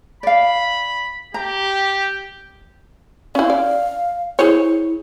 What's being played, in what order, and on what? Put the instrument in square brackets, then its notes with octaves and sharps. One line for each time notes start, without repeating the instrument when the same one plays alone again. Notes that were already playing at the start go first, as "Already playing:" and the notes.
[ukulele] D5 F5 [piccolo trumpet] B5
[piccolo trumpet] G4 [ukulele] A#5
[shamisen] C#4 E4 [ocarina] F5
[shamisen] D5
[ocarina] E4 [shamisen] G#4 C5 C#5